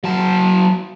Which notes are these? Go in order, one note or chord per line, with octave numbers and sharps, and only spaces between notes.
F#3 A5